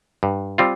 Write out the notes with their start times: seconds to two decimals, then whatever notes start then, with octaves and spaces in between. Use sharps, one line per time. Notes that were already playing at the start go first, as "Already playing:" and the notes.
0.23 G2
0.58 G3 C4 F4